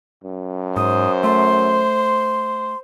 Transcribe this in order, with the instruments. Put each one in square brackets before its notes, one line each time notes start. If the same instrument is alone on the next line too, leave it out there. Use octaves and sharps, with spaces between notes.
[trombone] F#2
[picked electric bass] G#2 [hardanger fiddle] C5 [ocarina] D#6
[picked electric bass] A3 [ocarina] C6